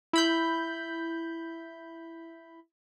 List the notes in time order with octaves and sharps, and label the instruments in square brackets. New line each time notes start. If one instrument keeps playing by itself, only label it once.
[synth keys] E4 B5 G6